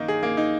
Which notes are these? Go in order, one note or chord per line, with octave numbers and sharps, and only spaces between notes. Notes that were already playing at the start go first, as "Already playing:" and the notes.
Already playing: D#3 A#3 D#4
G#4
A#3
D#4